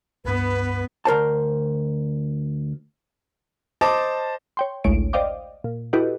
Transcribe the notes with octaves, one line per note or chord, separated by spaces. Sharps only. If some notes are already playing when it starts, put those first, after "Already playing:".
C#2 G2 B3 B4
D2 A#4 C5 A5
C5 D#5 A5 D6
C#5 G5 C6
A1 D2 G#3 C#5 D7
C5 D5 D#5 F5 G5 D6
A#2
E4 F#4 G4 A4 B4 D#5